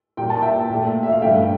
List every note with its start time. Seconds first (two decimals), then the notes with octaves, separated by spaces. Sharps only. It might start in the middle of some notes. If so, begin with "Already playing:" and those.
0.17 A#2 G3 A#3 G5
0.30 A5
0.42 E5 G5
0.70 A#2 A3
1.03 E5
1.12 F5
1.22 G2 D3 A3 E5 G5